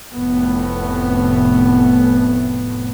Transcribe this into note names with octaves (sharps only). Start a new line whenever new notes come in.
F1 A2 B3